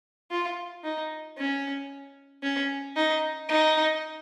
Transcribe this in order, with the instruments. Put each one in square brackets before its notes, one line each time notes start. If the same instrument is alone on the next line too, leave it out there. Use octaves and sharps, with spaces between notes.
[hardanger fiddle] F4
D#4
C#4
C#4
D#4
D#4